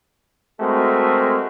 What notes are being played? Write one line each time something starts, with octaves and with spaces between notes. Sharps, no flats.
G#3 A3 C4 F#4 A4 A#4